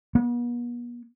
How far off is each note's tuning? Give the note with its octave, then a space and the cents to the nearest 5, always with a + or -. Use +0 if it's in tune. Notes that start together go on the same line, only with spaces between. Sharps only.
B3 -45